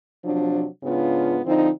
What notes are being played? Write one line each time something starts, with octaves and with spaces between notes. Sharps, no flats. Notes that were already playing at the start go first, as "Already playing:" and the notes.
C3 F3 F#3 D4
G#2 C#3 B3 D4 F4
D3 F3 C4 D#4